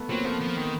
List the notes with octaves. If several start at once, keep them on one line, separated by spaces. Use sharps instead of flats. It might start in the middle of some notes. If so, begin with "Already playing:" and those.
Already playing: A3 B3
F#3 A#3 C4
F3 A3 B3
F3
D#3